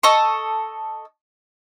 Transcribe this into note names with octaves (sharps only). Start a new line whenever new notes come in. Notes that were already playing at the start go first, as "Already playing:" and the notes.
A4 D#5 C#6